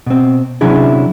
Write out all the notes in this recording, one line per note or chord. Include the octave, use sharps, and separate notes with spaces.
B2 C4
C3 F#3 C#4 D4 E4 G#4